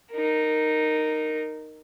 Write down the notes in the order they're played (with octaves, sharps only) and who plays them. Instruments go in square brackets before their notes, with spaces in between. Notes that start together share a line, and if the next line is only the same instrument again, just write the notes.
[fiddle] D#4 A#4